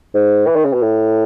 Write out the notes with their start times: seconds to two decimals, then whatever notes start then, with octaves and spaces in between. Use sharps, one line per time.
0.14 G#2
0.47 E3
0.56 D#3
0.65 C#3
0.73 B2
0.82 A2